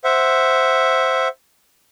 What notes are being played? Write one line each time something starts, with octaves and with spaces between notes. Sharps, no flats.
C5 E5 F#5